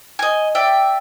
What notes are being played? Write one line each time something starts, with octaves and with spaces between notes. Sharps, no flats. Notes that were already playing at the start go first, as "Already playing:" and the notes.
D#5 G#5
D5 E5 G5